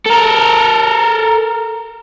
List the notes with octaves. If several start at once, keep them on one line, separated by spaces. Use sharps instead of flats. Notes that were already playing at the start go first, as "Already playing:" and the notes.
A4 A#4